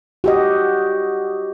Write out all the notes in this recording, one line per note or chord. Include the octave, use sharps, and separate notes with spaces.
F#4 G4 D#5